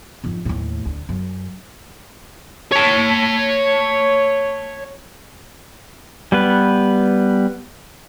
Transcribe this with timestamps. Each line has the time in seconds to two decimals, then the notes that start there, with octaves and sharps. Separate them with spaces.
0.24 F2 G#2
0.45 D#2 A2
0.85 D2
1.09 F#2
2.72 C#5 A5
6.32 G3 B3 B4